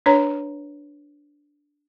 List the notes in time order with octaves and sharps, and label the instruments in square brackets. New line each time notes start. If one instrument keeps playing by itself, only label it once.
[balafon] D4 B4 C#5 A#5